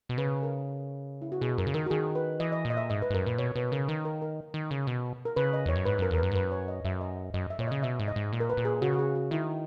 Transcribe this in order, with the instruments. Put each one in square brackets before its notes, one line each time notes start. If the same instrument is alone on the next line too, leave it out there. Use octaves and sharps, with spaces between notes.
[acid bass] B2
[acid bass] C#3 [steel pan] B4
[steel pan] A#4
E4
F#4
[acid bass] B2 [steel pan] G#4
[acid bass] F#2 [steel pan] A#4
[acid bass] C#3
[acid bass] D#3 [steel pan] A#4
[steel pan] F#4
[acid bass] D#3 [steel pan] G#4
[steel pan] B4
[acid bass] E3 [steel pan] D#5
[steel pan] D#5
[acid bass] A#2
[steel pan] D#5
E5
[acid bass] G#2 [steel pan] D#5
[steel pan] B4
[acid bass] G#2
[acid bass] F#2 [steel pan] A#4
[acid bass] A#2 [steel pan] B4
[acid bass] B2 [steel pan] C#5
[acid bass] B2 [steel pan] B4
[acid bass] C#3 [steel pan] A#4
[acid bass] D#3 [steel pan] A#4
[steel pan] A#4
A#4
[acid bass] D#3
C#3
B2
[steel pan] A#4
[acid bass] C#3 [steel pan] B4
[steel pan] D#5
[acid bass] E2 [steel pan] C#5
[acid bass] F#2
[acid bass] G#2 [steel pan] B4
[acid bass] F#2 [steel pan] A#4
[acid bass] E2 [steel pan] A#4
[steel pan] B4
[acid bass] F#2
G#2
[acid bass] F#2 [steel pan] B4
[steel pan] C#5
D#5
[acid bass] F#2 [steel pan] E5
[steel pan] D#5
[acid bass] F#2 [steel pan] D#5
[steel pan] E5
[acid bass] A#2 [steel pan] C#5
[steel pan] D#5
[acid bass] C#3
[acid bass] B2 [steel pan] E5
[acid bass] G#2
[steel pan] D#5
[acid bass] G#2
A#2
[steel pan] A#4
B4
[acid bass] A#2
[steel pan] G#4
[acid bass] C#3 [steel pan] F#4
[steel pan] F#4
G#4
F#4
[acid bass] D#3 [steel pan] E4